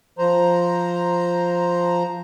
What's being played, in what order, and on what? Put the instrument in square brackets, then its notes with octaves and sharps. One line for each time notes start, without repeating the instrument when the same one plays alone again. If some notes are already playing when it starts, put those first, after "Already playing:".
[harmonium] F3 C5 A#5